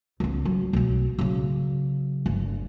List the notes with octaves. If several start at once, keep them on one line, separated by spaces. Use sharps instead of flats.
C#2 B3
F#3
B1 F#3
C#3 F#3
G1